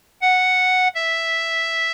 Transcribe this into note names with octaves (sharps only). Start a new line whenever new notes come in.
F#5
E5